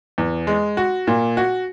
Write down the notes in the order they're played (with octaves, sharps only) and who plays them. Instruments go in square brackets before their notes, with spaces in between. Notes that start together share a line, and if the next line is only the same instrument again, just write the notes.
[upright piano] E2
G#3
F#4
A#2
F#4